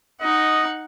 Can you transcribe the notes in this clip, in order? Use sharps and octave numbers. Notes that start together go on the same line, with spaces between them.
D#4 D#5 F#5